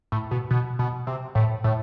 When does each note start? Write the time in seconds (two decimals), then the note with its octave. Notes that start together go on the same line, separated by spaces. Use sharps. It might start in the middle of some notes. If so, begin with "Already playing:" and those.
0.12 A2
0.31 B2
0.51 B2
0.79 B2
1.07 C3
1.35 A2
1.64 A2